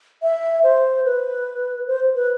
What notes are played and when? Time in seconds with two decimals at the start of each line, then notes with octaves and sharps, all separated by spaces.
0.22 E5
0.63 C5
1.05 B4
1.88 C5
2.15 B4